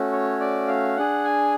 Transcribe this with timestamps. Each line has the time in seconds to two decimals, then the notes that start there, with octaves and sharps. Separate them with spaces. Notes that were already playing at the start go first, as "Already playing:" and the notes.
Already playing: A3 C#4 F#4
0.12 C#5
0.40 D5
0.68 F5
0.97 D4 G#4 F#5
1.24 G#5